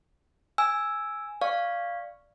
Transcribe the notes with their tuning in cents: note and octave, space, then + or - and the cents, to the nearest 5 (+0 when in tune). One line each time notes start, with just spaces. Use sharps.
G#5 +0 E6 +0
D5 +0 F5 -5 C#6 +0